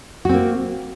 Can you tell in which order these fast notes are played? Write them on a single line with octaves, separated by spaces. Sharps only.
F#4 C4 A#3